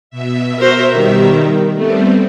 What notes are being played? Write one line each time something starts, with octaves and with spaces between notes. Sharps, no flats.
B2 E5
F#4 A#4 C5
D#3 G3
G3 A3 B3 C4